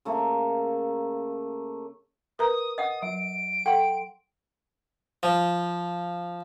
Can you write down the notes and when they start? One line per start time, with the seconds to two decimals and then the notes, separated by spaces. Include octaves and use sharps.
0.05 C#3 A3 A#3
2.39 A#4 B4 A#5 D#6
2.78 D#5 F#5 D#6
3.02 F#3 D7
3.66 A4 F#5 G5 C6
5.23 F3